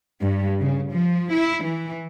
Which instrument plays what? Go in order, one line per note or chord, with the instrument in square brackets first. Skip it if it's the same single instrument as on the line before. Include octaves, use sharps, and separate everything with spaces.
[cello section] G2
C#3
F3
E4
E3